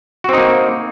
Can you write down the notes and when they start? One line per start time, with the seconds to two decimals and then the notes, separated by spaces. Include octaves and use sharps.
0.24 F#4
0.29 C4
0.33 D#4
0.38 A#3